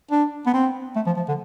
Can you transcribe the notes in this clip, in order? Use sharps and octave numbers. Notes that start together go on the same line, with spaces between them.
D4
B3
C4
A3
F3
F3
D3